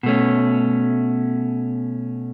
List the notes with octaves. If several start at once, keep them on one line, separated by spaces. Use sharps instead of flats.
B2 A3 C#4